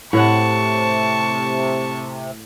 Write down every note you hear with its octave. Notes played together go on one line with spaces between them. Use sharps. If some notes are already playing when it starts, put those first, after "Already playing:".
A2 C3 C#5 F#5 A5 C#6